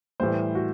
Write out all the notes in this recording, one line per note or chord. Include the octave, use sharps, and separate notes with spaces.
A2 E3 G3 C5
F#4